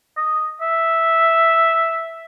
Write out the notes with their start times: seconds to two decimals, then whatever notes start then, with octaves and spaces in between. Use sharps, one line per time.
0.17 D#5
0.61 E5